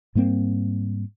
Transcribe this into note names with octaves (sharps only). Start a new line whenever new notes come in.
G#2 G3 A#3 C4